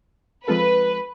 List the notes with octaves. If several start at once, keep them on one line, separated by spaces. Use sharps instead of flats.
F3 G#3 C4 F4 A4 B4